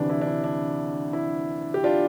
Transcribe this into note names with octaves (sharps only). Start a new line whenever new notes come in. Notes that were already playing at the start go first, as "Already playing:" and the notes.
Already playing: D2 C3 E3 D4
E4
D4
E4
D4
E4
G4
D4 F4